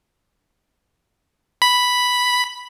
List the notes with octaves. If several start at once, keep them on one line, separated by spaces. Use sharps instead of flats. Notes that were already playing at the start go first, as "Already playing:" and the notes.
B5